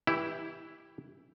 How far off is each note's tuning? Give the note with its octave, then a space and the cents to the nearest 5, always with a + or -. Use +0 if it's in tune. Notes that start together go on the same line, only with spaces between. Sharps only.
E3 -20 E4 +0 G4 +10